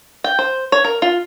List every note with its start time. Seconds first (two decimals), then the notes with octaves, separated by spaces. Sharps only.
0.24 G5
0.39 C5
0.72 C#5
0.84 A#4
1.02 F4